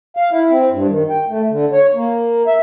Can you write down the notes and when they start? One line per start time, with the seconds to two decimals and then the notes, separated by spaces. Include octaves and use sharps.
0.17 F5
0.31 E4
0.50 C4
0.72 G2
0.89 D#3
1.10 G5
1.29 A3
1.50 D3
1.73 C#5
1.94 A#3
2.47 E5